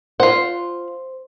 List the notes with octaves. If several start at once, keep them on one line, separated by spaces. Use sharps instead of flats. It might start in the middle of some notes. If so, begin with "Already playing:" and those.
F4 C5 F#5